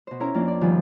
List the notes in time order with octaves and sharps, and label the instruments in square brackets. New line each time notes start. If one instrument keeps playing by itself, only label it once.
[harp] B2 C5
C#4 E4 A#4 A#5
F2 A#3 D4
D5
D2 G2 D#3 F3 F4 G#5